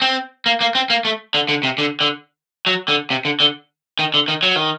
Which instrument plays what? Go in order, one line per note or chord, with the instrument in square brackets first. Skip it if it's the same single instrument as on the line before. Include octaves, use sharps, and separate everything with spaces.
[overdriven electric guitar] C4
A#3
A#3
C4
A#3
A3
D3
D3
C3
D3
D3
F#3
D3
C3
D3
D3
D#3
D3
D#3
F#3
D#3